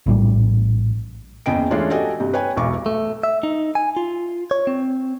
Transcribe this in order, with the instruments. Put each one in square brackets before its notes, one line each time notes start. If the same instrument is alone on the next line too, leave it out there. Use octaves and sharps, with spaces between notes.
[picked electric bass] A#1 A2 E3 G3
[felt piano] F#1 E2 C#3 D#5 G5 D7
E3 G#3 A3 C#4 D4 F4
F#4 G4 A4 D#5 G#5
G2 C3
B4 C#5 G5 G#5
E1 B1 B2 E3 C#6 D6
[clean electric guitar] A3
E5
D#4
G#5
F4
C#5
C4